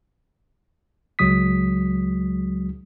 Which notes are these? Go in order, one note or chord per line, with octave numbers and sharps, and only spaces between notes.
C#2 F#3 G#3 D#6 B6